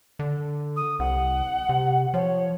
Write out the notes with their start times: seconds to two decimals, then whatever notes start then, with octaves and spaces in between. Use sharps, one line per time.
0.19 D3
0.76 D#6
0.99 C2 F#5
1.69 C3
2.14 F3 C#5